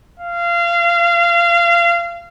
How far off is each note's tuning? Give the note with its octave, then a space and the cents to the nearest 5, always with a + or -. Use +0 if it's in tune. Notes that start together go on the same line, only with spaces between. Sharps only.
F5 -25